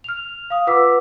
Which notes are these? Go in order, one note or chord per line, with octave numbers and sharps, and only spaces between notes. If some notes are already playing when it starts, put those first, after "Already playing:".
F6 F7
F5 D#6
F4 B4 F#5 D6 E6 B6